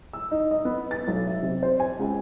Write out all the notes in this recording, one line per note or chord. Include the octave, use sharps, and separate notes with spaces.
E6
D#4
D#5
B3
A6
B1
E5
C3
C5
G#5
C#2